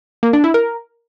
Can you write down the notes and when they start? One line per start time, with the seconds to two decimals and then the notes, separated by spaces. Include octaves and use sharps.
0.23 A#3
0.33 D4
0.44 E4
0.54 A#4